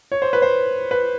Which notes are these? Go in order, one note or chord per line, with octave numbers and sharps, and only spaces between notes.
C#5
C5
B4
C5
B4